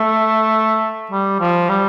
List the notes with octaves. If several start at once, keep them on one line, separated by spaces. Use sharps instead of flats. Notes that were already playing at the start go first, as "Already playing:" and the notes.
Already playing: A3
G3
F3
G3